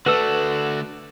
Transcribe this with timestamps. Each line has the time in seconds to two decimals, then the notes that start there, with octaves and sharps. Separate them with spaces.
0.06 D3 A3 F#4 A4 B4 D5 E6